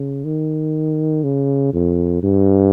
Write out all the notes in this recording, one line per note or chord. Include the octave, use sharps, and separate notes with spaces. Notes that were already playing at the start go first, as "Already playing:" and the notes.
Already playing: C#3
D#3
C#3
F2
G2